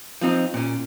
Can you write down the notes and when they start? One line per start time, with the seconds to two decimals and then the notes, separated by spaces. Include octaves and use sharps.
0.21 F3 C4 D#4
0.54 A#2 C#4